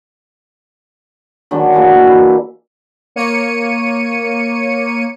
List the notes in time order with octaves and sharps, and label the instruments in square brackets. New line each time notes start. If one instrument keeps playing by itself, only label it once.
[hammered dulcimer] D#3 F#3 G#3 D4
E3 F#3 G#3 A#3
E4 A#4
[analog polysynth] A#3 C#5 C#7 D#7